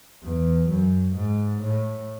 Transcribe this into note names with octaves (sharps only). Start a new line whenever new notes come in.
E2
F#2
G#2
A2